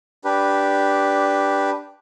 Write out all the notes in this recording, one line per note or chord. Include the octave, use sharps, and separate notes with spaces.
D4 G4 B4